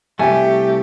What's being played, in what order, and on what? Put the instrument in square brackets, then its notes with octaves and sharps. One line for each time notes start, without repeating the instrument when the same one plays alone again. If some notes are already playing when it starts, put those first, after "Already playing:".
[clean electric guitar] C2 A3 [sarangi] G4 [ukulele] G5 G#5